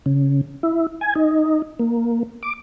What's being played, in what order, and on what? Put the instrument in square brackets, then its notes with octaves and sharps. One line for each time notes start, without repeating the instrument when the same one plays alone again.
[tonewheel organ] C#3
E4
G#5
D#4
A#3
D6